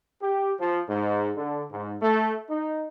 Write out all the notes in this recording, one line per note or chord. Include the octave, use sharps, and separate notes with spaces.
G4
F3
G#2
D3
G#2
A3
D#4